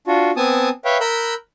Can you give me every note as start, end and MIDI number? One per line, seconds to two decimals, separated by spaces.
0.07 0.31 62
0.07 0.31 65
0.07 0.31 66
0.36 0.69 59
0.36 0.69 60
0.36 0.69 80
0.36 0.69 81
0.36 0.69 87
0.85 0.98 71
0.85 0.98 73
0.85 0.98 76
0.85 0.98 77
0.85 0.98 79
1.00 1.34 70
1.00 1.34 83
1.00 1.34 88
1.00 1.34 90
1.00 1.34 91